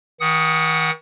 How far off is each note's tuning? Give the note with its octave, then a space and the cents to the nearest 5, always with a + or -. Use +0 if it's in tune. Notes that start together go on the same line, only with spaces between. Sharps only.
D#3 +45 F#5 +0 D#6 +0